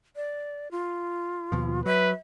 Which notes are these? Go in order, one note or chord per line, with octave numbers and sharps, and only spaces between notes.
D5
F4
D#2 B2 F3
F#3 B4 E5